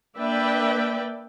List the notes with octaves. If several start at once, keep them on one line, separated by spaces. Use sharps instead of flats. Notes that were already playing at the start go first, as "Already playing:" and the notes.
A#3 D4 B4 D5 E5 G5